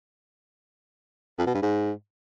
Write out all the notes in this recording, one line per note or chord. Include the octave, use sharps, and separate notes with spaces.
F2
B2
G2
G#2